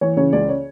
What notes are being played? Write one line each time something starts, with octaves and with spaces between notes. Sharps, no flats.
E3 C#5
C#3 C#5
C#2 D5
C#5